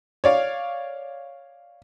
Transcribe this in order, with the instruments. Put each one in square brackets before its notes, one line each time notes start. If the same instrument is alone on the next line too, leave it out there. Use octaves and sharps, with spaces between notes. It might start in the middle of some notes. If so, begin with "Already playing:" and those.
[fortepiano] C#5 D5 F5